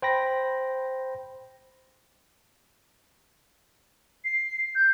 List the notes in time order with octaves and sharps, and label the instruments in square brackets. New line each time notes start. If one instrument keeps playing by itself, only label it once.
[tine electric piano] C5 G5 B5 A#6
[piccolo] C7
G6